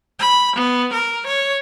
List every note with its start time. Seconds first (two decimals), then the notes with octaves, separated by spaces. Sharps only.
0.19 B5
0.56 B3
0.93 A#4
1.26 C#5